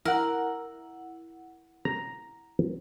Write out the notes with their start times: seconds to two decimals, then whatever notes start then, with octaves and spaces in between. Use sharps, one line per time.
0.05 E4 A#4 F#5
1.85 A#5